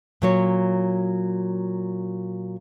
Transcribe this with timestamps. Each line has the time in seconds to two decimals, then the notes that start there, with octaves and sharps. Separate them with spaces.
0.22 A#2 F#3 C#5